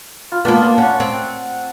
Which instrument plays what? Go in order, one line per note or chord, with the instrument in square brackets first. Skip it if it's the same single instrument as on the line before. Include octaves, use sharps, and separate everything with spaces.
[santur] F4
[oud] A#3 B3 [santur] D4 F4
[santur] F5 A5
[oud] C#4 [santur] F#5 C#6
[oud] C4